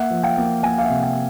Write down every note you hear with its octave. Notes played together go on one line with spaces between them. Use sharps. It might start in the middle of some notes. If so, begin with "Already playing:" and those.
Already playing: A#3 E5 F#5
F3
F5 G5
A#3
A#3 F#5 G#5
F5
E5 F#5
C3
F5 G5